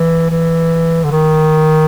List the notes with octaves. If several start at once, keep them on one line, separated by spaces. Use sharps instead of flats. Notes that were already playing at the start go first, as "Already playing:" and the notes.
Already playing: E3
E3
D3
D#3